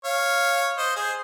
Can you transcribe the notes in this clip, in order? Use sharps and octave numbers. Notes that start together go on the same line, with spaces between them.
C#5 F5
C5 D#5
G#4 C5